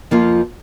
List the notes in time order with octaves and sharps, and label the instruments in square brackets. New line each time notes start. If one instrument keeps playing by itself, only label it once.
[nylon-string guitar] F2 F3 A#3 F4